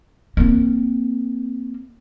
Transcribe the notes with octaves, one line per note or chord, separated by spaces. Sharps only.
A#3 C4